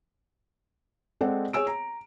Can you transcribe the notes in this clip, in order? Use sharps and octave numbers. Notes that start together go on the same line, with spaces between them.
G#3 C4 A4 C5 D5 F#5
G#4 C#5 G#5 E6 D7
A#5